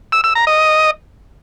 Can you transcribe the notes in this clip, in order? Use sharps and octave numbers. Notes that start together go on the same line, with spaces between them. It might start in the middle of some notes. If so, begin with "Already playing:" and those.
E6
E6
A#5
D#5